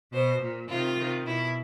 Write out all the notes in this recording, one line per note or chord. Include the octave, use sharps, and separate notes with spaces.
B2 C5
A#2
C3 D#3 F4
C3 D#3
B2 E4